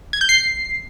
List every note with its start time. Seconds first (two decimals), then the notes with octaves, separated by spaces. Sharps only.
0.13 G#6
0.21 G6
0.29 C7